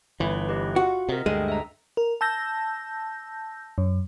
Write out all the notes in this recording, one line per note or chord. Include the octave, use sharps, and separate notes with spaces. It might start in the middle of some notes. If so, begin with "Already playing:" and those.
G1 E3 E5 B5
G4 B4 D#5
F4 F#4 F#5
C3 A#4 D#5
D2 G2 G#3 A4 G5 D#7
E5 A#5
A#4
A5 E6 G6 A#6
F#2